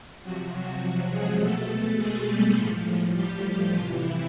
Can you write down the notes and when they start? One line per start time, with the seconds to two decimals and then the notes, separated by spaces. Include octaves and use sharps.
0.23 C3 F3 F#3 F#4
0.52 F#3 F#4
0.81 F#3 F#4
1.10 G#3 G#4
1.39 B2 A3 A4
1.96 G#3 G#4
2.25 G3 G4
2.54 A2 F3
3.13 G3 G4
3.70 C3 E3 F3 F4
3.98 E3 E4